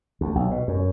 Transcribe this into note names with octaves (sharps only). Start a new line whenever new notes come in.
D2
B1
B2
F#2